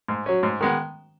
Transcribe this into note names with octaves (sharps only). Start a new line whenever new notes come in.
G#2
F#3 C#4
G#2
D#3 G#3 B3